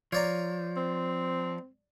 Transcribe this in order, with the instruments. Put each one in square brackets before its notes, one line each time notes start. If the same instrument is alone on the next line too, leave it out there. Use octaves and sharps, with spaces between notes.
[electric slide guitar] F3 [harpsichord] C#5 D5 A#5
[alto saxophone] C4